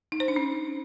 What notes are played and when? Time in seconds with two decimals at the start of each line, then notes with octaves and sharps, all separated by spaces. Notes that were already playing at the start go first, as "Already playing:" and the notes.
0.12 D#4
0.20 C5
0.28 D4
0.36 C#4